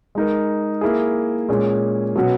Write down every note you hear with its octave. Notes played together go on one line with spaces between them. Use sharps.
G#3 D#4 A#4
A#3 E4 G#4
A#2 G#3 C#4 G#4
B2 F#3 C#4 F#4 B4